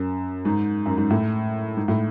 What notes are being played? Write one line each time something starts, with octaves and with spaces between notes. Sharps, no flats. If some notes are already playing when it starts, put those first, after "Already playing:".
Already playing: F#2
G#2
F#2
G#2
A2
G#2
A2